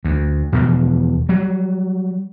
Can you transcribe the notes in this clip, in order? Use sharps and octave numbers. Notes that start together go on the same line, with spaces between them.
D2
E2 B2 E3 F3
F#3 G3